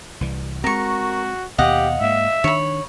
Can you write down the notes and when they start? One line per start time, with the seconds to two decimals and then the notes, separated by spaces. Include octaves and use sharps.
0.21 C2 E3 G3
0.64 G#3 C4 F#4 A#4 C#6
1.58 D#2 B2 G4 D#5 F5 F#5
2.01 G#2 A#3 E5
2.44 D#3 D4 C#5 B5